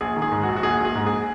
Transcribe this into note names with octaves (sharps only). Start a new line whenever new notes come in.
A#1 G#4
D#3
G#4
G#2
F#4
A#1
F#4
A#1 G#4
A#1
G#4
G#2
G#4